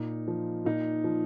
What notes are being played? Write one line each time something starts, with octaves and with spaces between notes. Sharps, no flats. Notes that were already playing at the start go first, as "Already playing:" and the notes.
Already playing: A#2 D#4
F3
A#2 D#4
F3